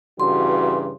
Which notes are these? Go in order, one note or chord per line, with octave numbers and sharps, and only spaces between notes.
G2 C#3 E3 F#4 C6